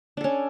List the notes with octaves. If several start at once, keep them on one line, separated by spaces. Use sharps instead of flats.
C#4 D4 A4